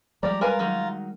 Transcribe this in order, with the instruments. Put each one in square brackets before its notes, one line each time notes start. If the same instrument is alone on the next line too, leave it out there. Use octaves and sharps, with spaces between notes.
[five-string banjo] F3 D5 [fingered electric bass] G3 G#3 [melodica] G4 A#5
[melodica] F4 A#5 [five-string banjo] A#4 B4 G#5
[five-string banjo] D#3 F#3